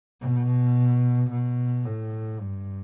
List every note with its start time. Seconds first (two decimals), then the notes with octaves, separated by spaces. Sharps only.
0.21 B2
1.31 B2
1.85 A2
2.40 G2